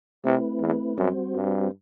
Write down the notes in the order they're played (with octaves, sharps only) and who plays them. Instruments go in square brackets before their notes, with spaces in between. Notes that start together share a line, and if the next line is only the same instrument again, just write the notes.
[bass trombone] C3 [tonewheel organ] A3 C4 E4 B4
[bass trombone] E2
[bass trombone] F#2 [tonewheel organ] G3 C4 F#4 C5
[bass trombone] G2